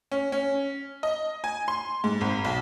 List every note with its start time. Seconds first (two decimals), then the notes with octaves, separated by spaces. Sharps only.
0.11 C#4
0.32 C#4
1.03 D#5
1.44 G#5
1.68 C6
2.04 G#2
2.21 G#1
2.45 B1